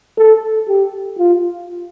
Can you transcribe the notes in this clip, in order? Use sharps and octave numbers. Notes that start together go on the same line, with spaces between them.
A4
G4
F4